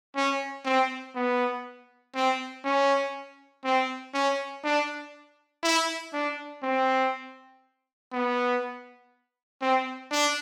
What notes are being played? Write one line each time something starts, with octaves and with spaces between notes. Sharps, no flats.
C#4
C4
B3
C4
C#4
C4
C#4
D4
E4
D4
C4
B3
C4
D4